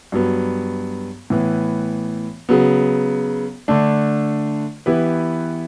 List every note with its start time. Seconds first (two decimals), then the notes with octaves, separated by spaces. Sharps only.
0.12 G2 F#3 B3
1.30 A2 E3 B3
2.49 C#3 F#3 B3
3.68 D3 A3 D4
4.86 E3 B3 E4 G4 B4